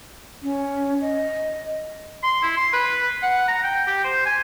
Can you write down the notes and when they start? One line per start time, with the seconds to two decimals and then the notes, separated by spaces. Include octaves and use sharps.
0.43 C#4
1.01 D#5
2.23 C6
2.42 E4
2.57 C6
2.73 B4
3.22 F#5
3.48 A#5
3.63 G5
3.87 G4
4.04 C5
4.25 G#5